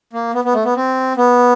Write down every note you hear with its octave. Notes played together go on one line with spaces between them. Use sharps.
A#3
B3
B3
A3
B3
C4
B3